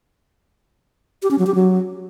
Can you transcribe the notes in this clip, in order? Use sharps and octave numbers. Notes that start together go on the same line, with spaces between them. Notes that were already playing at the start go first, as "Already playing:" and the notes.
G4
C#4
F#3
G4
F#3